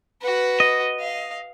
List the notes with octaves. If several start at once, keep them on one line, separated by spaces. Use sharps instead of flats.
F#4 B4
D#5
F5